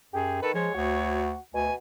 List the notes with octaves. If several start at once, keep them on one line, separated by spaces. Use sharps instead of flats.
F#2 G4 G#4
D#3 A4 B4
F3 G#3 C#5
D2 F#4
D2 B2 G#5